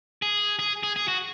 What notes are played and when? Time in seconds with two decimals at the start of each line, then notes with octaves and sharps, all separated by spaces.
0.22 G#4
0.59 G#4
0.83 G#4
0.96 G#4
1.08 F#4